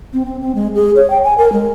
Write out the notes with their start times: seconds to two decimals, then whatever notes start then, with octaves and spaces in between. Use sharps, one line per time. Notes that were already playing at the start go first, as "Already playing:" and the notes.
0.13 C4
0.26 C4
0.41 C4
0.55 G#3
0.75 G#4
0.96 C#5
1.10 G5
1.24 G#5
1.38 A#4
1.53 G#3